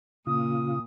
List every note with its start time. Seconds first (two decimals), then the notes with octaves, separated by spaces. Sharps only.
0.27 A#2 C#3 F4 D#6